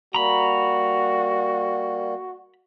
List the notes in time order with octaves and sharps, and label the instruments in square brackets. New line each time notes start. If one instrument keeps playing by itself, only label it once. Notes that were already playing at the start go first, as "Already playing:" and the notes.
[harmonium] G3 A#3 [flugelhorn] F#4 [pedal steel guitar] A#5 B5